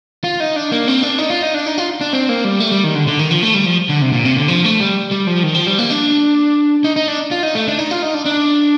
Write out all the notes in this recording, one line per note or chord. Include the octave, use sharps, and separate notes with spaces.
F4
D#4
D4
A#3
C4
D4
D#4
F4
D#4
D4
D#4
F4
D4
C4
A#3
G3
A3
G3
D#3
D3
D3
D#3
F3
A3
G3
F3
D3
C3
A#2
C3
D3
F3
A3
G3
G3
F3
D#3
F3
G3
A#3
D4
D#4
D#4
D4
F4
D#4
A3
D4
D#4
F4
D#4
D4
D4